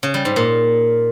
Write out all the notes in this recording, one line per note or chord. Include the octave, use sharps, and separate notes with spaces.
C#3
G3
G#2
A#2